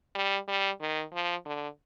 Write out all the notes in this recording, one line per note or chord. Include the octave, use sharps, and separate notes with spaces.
G3
G3
D#3
F3
D3